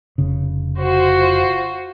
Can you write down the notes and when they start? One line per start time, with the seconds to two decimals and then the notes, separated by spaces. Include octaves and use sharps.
0.18 F1 C#3
0.80 F4 F#4 C5